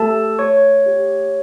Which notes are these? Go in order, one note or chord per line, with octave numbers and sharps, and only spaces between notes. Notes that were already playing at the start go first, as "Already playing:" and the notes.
Already playing: A3 G4 A4 A5
A3 C#5 C#6
G4